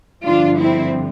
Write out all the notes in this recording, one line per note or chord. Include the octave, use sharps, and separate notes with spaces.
G2 D3 F3 D4 F4
C4 E4